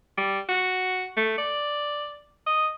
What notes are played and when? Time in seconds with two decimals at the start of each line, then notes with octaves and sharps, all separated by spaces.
0.17 G3
0.49 F#4
1.17 A3
1.38 D5
2.46 D#5